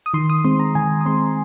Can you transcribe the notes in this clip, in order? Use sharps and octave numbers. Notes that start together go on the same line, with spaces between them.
D#6
D#3 C6
D#6
G#3 C4 C6
A#5
D#3 G#5
D#6
G#3 C4 C6